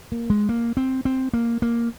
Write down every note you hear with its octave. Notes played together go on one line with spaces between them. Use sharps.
A#3
G#3
A#3
C4
C4
A#3
A#3